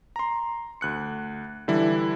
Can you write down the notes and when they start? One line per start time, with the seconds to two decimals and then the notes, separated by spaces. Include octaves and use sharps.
0.16 A#5 C6
0.81 D2 F#6 C#7
1.68 D3 E3 G3 E4